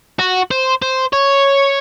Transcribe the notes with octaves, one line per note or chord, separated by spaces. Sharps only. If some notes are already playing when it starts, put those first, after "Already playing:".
F#4
C5
C5
C#5